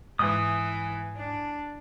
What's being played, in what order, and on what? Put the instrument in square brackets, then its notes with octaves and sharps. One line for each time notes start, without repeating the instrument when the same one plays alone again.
[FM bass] G#2 [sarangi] E3 [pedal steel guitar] G#5 D#6
[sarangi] D4